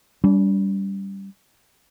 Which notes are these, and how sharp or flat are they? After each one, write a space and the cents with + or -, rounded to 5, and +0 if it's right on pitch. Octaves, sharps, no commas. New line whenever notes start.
G3 +0 D4 -45